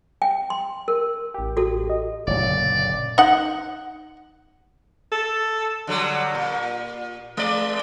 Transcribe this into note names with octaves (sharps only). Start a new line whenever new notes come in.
G5
C6
A#4
A1 G4
F#4 A4
D#5
F#1 B1 A#2 D3 C#5 D5
D#4 F#5
A4
D3 F#3 G3
A#2
G#3 D5